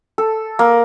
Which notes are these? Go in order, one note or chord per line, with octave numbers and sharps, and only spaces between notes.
A4
A#3